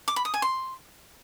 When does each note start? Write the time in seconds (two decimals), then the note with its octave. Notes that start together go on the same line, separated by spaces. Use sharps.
0.08 D6
0.16 B5
0.25 D#6
0.34 G#5
0.42 C6